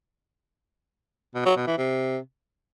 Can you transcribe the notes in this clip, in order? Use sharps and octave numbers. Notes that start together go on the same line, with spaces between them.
B2
F#3
B2
E3
C3